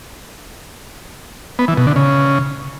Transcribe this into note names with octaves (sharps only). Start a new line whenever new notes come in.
B3
E3
B2
D3
C#3